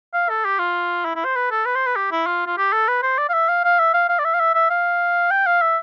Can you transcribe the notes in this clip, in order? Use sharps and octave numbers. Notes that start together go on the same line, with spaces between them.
F5
A4
G4
F4
E4
E4
C5
B4
A4
B4
C5
B4
G4
E4
F4
F4
G4
A4
B4
C5
D5
F5
E5
F5
F5
E5
F5
F5
D5
E5
F5
E5
E5
F5
G5
F5
E5